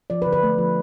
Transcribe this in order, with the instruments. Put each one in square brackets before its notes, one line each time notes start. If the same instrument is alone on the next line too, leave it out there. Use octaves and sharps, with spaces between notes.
[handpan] F3 D5
B4
D3
B4
A3
F3